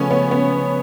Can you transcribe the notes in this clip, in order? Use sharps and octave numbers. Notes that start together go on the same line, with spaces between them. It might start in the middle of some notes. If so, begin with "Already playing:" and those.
Already playing: C#3 F3 A3 B3 C#4
B3
B3